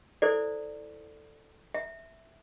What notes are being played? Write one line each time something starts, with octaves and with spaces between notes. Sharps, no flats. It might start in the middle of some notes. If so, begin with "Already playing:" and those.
E4 A4 C5 D5
E5